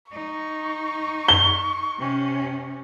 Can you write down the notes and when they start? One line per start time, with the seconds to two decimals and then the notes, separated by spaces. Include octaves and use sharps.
0.12 D#4 C#6
1.28 G7
1.99 C3 C#4